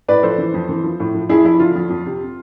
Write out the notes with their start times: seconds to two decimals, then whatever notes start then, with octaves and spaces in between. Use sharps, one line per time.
0.08 A2 B4 D5
0.23 F3 A4 C5
0.38 E3
0.54 F2
0.69 E3
0.84 F3
1.00 A2
1.14 F3
1.29 F2 E4 G#4
1.44 F2 E4
1.59 D3 F4
1.75 F2
1.90 F2
2.06 C3